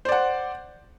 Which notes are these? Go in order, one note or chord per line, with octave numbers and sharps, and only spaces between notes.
C5 D5 F#5